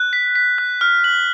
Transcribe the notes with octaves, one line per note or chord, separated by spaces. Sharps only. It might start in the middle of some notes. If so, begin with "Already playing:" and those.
Already playing: F#6
B6
B6
F#6
F6
F#7